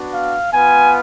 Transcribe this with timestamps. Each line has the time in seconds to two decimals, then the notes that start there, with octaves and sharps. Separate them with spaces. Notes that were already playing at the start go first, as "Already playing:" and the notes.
Already playing: B3 D4 F#4
0.14 F5
0.54 B3 F4 G#5